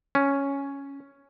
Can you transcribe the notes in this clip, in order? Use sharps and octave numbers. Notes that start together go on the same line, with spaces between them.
C#4